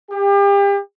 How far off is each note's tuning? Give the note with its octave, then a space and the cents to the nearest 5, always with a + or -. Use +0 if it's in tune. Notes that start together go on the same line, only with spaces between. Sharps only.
G4 +35